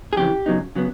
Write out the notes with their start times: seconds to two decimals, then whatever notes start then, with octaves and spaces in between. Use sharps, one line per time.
0.13 G#4
0.17 F2 C#3 E3 G4
0.46 C#3 F#3 B3 D#4
0.75 C#3 F#3 B3